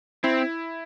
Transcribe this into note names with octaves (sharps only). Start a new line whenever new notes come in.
C4 E4